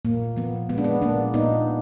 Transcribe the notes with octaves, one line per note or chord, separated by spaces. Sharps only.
A#2 A#3
F3 B3
G#3 B3
D4
B3
A#2 A#3 D4
A#2 B3 D#4